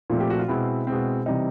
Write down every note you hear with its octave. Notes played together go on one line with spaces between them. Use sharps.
A#2 F3 A3 C4
G4
F#4
F4
B2 G#3 C4 E4
B2 G#3 C4
C3 E3 G3 C4 D#4